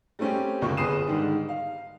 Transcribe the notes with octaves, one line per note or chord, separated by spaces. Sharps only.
G3 A3 C4 C#4 G4
G1 C#2 F#2 A#3 C#6
G1 G#4 B4 D#6 C7 E7
G#2 D3 D#3 G3
F5